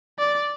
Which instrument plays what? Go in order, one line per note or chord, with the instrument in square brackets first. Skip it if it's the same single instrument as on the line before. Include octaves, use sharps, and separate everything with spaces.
[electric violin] D5